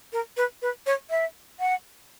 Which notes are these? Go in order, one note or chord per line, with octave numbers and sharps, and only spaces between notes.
A#4
B4
B4
C#5
E5
F#5